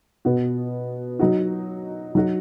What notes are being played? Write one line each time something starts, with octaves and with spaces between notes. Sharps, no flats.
B2 B3 F#4
F#3 D#4 F#4
F#3 D#4 F#4